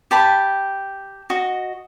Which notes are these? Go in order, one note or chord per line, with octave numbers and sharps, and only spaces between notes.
G4 A5 B5
F#4 D#5